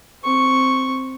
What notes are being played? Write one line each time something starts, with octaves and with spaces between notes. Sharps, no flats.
C4 C#6